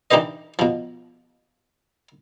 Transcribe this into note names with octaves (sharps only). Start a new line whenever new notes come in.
E3 D4 D#4 G4 B4 D#5
B2 F3